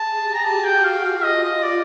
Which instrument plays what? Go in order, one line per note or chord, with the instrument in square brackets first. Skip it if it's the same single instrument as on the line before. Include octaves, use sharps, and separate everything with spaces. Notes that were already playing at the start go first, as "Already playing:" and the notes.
Already playing: [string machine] G#4 [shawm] A5
[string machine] G4
[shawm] A#5
[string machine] F#4 [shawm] A5
[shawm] G5
F5
[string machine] F4 [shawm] F5
[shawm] D#5
[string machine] F4
[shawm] D#5
D5